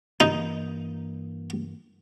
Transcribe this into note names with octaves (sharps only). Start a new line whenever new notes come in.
G2 E3 A#3 D#4